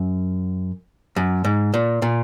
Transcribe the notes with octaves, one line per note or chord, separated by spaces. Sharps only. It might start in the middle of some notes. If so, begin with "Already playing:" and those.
Already playing: F#2
F#2
G#2
A#2
A#2